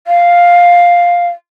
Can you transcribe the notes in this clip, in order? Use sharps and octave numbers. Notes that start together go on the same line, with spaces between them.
F5